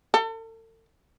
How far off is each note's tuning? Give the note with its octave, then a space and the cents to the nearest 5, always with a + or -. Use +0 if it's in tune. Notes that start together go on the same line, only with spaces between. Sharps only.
A4 +40